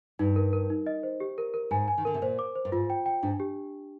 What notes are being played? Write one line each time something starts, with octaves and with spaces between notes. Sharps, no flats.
G2 D#4
A#4
A#4
D#4
D#5
C5
G4
A#4
A#4
G#2 G#5
G#5
D#3
D3 A#4
C3
A#2 C5
D6
C5
G2
G#2 F4
G5
G5
G#2 D4
G4